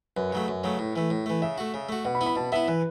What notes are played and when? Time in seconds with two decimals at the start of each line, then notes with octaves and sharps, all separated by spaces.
0.16 F#2 B4
0.32 C#3 F#3 A3
0.48 F#2
0.64 C#3 F#3 A3
0.79 A2
0.96 E3 A3
1.10 A2
1.26 E3 A3
1.42 C#3 E5
1.58 A3 F#4
1.74 C#3
1.89 A3 F#4
2.05 B2 F#5
2.15 B5
2.21 B3 E4
2.26 B5
2.36 B2 A5
2.52 B3 E4 E5
2.68 E3 B4